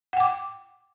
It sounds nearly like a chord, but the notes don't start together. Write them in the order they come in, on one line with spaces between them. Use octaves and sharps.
F#5 G5 D6